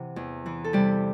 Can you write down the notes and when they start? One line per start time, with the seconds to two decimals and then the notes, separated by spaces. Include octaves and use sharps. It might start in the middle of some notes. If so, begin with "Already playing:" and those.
Already playing: C3 E3 F#5
0.16 E2
0.46 E3
0.64 A4
0.73 C3 G3 G4